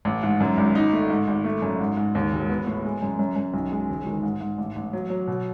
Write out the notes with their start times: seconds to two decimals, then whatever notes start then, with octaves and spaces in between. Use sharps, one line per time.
0.05 A1
0.23 G#2
0.40 F#2
0.58 G#1
0.75 D#4
0.93 A3
1.10 G#2
1.28 G#1
1.44 A3
1.62 F#2
1.80 G#2
1.97 G#2
2.15 D#2
2.33 E1
2.50 B3
2.67 A2
2.85 G#3
3.02 F#2
3.19 F#2
3.36 F#2
3.54 B1
3.72 G#3
3.89 E1
4.06 D#3
4.23 G#2
4.41 G#2
4.58 A1
4.76 A1
4.93 F#3
5.10 F#3
5.27 B2